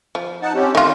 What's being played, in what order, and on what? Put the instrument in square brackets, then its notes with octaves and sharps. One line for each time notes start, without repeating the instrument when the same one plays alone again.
[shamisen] F3
[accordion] D#4 F#5 A5
C4 C#4 G4
[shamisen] D#3 F4 [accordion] A3